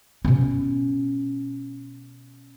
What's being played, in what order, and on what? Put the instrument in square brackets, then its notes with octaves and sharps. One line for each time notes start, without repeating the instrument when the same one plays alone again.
[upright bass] B2 C#4